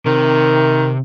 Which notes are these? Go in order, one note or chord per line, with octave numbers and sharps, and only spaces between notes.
C3 D#3